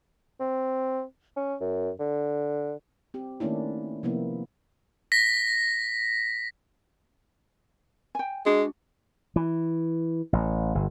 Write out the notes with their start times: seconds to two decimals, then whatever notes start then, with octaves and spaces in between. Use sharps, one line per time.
0.40 C4
1.36 C#4
1.61 F#2
1.99 D3
3.14 C4 G4
3.40 D#3 A3 A#3 C#4 D4 E4
4.03 C3 F3 A#3 B3 E4
5.12 A#6 B6
8.15 G5 G#5
8.46 G#3 D4 F#4 F#5
9.36 E3
10.33 A1
10.75 G1